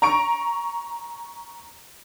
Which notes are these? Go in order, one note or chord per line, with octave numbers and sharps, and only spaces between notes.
A#5 C#6 D7